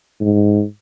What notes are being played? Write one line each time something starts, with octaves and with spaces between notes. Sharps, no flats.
G#2